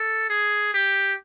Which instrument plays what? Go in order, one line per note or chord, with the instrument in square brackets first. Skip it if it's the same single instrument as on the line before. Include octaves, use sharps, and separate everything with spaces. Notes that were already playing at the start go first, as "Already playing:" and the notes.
Already playing: [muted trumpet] A4
G#4
G4